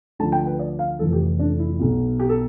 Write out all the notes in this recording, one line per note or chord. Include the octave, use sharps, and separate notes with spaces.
D2 D3 F3 A5
G5
B4
D5
F5
F1 F2 E3 A4
G4
D4
E4
B1 B2
G4
A4